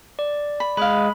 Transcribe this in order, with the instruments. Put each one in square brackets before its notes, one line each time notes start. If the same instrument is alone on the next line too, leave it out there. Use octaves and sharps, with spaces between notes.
[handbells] D5
[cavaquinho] B5
[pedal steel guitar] G#3 [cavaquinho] B4 F5 [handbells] B5